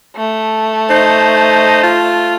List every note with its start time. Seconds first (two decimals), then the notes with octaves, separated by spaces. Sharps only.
0.17 A3
0.90 D#4 C5
1.83 F4